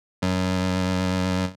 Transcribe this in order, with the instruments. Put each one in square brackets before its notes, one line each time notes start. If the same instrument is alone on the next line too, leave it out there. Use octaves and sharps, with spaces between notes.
[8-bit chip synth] F#2